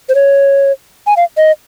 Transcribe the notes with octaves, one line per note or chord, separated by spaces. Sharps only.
C5
C#5
G#5
F5
D#5